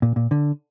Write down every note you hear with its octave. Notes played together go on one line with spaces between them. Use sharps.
A#2
A#2
D3